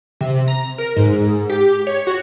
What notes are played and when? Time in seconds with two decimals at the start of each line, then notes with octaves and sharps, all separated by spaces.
0.21 C3
0.48 A#5
0.78 A#4
0.96 G#2
1.50 G4
1.87 C#5
2.07 F#4